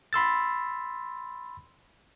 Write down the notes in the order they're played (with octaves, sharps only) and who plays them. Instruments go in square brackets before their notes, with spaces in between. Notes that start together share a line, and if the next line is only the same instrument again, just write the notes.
[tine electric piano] B5 C6 E6 A6